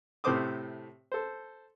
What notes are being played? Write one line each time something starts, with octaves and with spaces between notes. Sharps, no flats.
A2 C3 A3 C5 D6 D#6
A4 C5